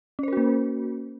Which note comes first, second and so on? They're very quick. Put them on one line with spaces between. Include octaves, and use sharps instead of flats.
C#4 C5 A#4 F#4 A#3